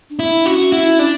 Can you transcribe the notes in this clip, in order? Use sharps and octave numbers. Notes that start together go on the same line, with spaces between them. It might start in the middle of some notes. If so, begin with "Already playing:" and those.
D4
E4
D4
C#4 F#4
E4
D4